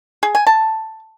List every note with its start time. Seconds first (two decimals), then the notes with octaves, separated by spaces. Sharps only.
0.23 G#4
0.35 G#5
0.47 A5